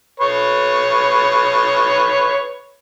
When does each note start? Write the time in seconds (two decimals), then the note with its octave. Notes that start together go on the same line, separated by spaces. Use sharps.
0.20 B4 C#5